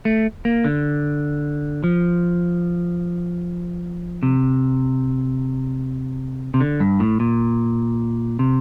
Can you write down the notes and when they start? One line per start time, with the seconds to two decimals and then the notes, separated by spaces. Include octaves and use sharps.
0.05 A3
0.45 A#3
0.65 D3
1.84 F3
4.23 C3
6.54 C3
6.61 D3
6.80 G2
7.00 A2
7.20 A#2
8.39 C3